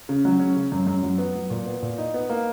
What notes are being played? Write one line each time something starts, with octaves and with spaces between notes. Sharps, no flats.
C#3
F#3
C#4
C#3
F#2
F#2
F#3
B3
F#3
A#2
B3
A#2
D#4
B3
A#3